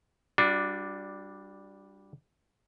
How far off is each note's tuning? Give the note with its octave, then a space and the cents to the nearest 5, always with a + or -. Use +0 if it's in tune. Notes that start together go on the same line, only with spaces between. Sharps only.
G3 +0 D4 +0 F#4 -40